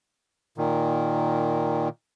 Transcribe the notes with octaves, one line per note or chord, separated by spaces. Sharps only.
A#2 D#3